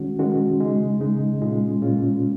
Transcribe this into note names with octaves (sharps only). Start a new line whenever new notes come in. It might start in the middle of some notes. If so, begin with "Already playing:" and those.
Already playing: D#3 G#3 C#4 F#4
D#3 G#3 C#4 F#4
C#3 G#3 D#4
C#3 G#3 D#4
A#2 G#3 C#4 F4
A#2 G#3 C#4 F4